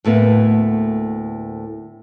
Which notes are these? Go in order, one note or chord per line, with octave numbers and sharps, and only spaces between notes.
D2 A2 A#3 B3